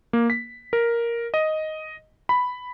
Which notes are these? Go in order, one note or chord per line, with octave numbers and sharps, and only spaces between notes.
A#3
B6
A#4
D#5
B5